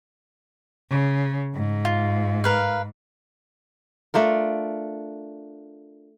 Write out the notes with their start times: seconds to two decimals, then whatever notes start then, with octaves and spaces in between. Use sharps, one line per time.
0.91 C#3
1.55 G#2
1.85 F4
2.44 A#4 B4 F5
4.14 A3 D4 F4 A#4